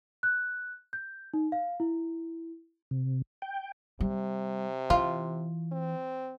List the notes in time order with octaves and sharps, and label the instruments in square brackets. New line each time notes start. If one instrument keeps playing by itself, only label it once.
[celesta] F#6
G6
D#4
F5
E4
[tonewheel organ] C3
G5
[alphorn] C3 [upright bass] G3
[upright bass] E3 [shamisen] F4
[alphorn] C4